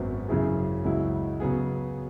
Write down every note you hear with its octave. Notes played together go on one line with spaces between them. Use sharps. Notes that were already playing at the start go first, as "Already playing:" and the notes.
Already playing: G#1 F#2 F#3 B3
F#2 C#3 F#3 E4 G#4
C#2 C#3 F#3 E4
C#3 F#3 B3 G#4